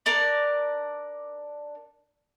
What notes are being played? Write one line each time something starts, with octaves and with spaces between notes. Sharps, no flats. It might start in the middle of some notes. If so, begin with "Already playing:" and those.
D4 A#4 D5